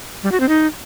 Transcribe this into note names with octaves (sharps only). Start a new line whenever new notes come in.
G3
F#4
C4
D#4